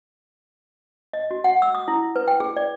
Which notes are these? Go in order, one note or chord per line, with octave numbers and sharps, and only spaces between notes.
D#5
F#4
F#5
E6
D#6
E4
B4
G5
G#4
D5